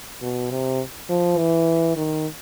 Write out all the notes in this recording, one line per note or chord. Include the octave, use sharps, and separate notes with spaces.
B2
C3
F3
E3
D#3